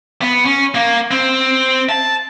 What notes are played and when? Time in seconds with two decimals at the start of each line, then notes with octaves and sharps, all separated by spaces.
0.21 B3
0.45 C#4
0.75 A#3
1.11 C4
1.89 A5